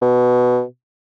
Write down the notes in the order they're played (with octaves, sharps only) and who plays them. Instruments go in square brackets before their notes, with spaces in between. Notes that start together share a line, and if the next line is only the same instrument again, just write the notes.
[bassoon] B2